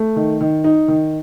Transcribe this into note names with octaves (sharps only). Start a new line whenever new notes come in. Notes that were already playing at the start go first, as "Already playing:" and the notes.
Already playing: A3
D#3
D#3
D#4
D#3